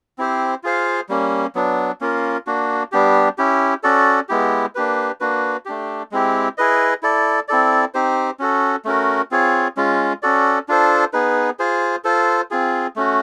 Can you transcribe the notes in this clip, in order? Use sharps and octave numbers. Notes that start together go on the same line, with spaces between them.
C4 E4 G4 C5
F4 G#4 C5 F5
G3 A#3 C#4
F#3 B3 D4
A#3 C#4 F4 A#4
A#3 D4 F#4
G3 B3 D4 G4
C#4 E4 G4
C#4 F#4 A4 D5
G#3 B3 E4 G4
A#3 D4 G4 B4
A#3 D4 F#4 B4
A3 D4 G4
G#3 C4 E4 G4
E4 G#4 B4 D#5
E4 A4 D5
C4 E4 A4 D5
C4 D#4 G4 C5
C#4 F#4 A4
A3 C#4 F#4 A#4
C4 F4 G#4 C#5
G#3 C#4 F4
C#4 F#4 A4 D5
D4 F4 A4 C5
B3 D#4 G#4 B4
F4 G#4 C5
F4 A4 C5
C4 F4 G#4
A3 C#4 F#4